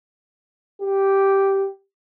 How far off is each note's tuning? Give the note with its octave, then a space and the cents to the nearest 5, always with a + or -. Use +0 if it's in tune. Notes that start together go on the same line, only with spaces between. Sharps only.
G4 -5